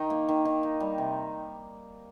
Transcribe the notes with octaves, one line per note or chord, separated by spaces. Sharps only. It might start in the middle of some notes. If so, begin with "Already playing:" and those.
Already playing: D#3 D#4
A#3
D#3
D#3
D#4
G3
C3